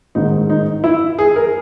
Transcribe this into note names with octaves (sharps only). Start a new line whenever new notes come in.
A1 G#2 D#3 D#4
D#4
E4
G#4
A#4